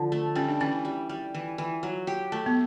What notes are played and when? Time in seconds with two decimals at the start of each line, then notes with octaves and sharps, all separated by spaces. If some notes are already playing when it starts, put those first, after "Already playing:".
Already playing: D3 F3
0.12 A3
0.35 G3 C#4
0.49 D4
0.61 E3 C#4
0.85 G3
1.09 G3
1.34 E3
1.58 E3
1.83 F#3
2.07 G4
2.32 A3
2.46 B3